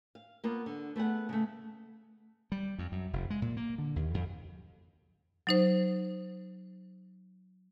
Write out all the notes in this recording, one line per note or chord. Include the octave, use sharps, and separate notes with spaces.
F5
A#3 B3 F4
D3
A3 B3 G#4 F#5
C#3 A3
G3
F2
F#2
F1
G#3
A#2
A#3
D3
D#2
F2
F#3 D#4 C5